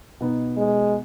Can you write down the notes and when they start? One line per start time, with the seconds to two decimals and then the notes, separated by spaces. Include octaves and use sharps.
0.20 B2 B3 D#4
0.57 G#3